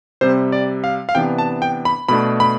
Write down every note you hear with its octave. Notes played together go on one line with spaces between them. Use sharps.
C3 G3 C4 C5
D5
F5
F5
C3 E3 B3 D4 G5
A5
G5
B5
B2 A3 D4 B5
B5